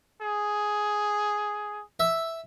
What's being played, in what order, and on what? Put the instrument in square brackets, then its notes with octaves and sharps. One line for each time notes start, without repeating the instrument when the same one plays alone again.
[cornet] G#4
[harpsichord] E5